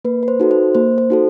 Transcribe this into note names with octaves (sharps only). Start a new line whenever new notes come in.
A#3 B4
B4
C5
D#4 F#4 A4
C5
A#3 C5
C5
D#4 F#4 A4